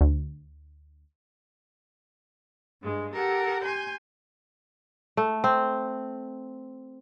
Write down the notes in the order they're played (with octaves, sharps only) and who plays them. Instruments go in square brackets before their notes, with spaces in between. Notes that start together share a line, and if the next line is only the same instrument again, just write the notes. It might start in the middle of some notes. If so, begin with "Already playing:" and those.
[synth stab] D2
[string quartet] G2 G#3
G4 A4 A#4 F#5
G#5 C6 G6
[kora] A3
C4